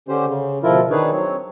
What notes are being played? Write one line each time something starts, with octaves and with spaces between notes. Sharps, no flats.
D3 C#4 G4 C5
C#3
D2 B2 F3 E4 F4 A#4
D#3 D4 D#4 G#4 B4 C#5
F#3 C4 C#5